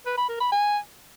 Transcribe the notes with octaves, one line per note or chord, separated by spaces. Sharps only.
B4
B5
A#4
B5
G#5